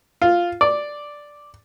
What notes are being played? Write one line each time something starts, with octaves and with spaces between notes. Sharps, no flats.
F4
D5